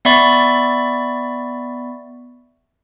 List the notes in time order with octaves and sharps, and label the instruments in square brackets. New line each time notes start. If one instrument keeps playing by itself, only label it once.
[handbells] B3 D5 E5 B5 C#6 A6